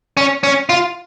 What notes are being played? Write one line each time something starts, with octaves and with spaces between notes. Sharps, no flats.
C#4
C#4
F4